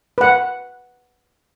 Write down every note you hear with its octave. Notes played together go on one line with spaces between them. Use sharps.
B4 F#5